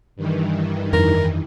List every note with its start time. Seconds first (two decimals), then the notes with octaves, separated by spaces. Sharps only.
0.16 G2 D#3 E3
0.93 F2 A#4